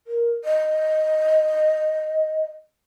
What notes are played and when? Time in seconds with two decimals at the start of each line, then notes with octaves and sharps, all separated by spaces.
0.07 A#4
0.44 D#5